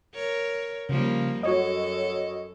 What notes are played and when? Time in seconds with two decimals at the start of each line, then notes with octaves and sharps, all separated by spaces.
0.15 A#4 C#5
0.89 C#3 F3 G3 A#3
1.43 F#2 F#4 A4 C#5 D#5